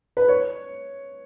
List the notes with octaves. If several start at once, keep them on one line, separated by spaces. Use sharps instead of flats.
B4
C#5